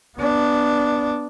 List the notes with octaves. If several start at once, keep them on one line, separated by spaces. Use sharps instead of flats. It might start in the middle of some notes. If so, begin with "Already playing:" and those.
B3 D4